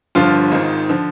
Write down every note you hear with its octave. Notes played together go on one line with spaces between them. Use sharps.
G1 G2 D3 F3 F4
G#1 G#2 D#3
D3 F3